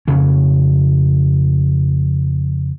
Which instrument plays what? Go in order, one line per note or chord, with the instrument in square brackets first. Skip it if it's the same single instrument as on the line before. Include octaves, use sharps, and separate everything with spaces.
[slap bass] F2 C#3 C#4